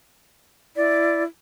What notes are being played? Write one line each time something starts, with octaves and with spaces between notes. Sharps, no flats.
E4 D5